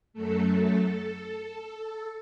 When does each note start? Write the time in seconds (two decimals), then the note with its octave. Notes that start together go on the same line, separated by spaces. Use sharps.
0.13 F#2 F#3 A3 A4